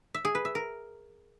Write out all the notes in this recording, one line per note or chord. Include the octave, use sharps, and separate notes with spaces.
E5
G#4
B4
E5
A#4